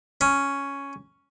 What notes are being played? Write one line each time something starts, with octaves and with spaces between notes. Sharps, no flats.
C#4